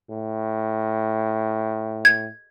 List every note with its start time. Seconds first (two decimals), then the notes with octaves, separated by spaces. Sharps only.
0.11 A2
2.05 G#6